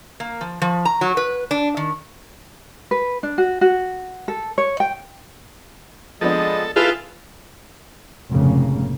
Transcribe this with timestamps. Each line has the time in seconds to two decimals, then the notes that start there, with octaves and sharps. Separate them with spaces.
0.20 A#3
0.41 F3
0.62 F3
0.85 A#5
1.01 F#3
1.17 B4
1.51 D4
1.77 D#3
2.91 B4
3.23 D4
3.38 F#4
3.61 F#4
4.28 A4
4.58 C#5
4.80 G5
6.21 F3 G#3 B3 D4 A4 D#5
6.76 E4 F4 G#4 A4 B4 F5
8.30 F1 G#2 C#3 A#3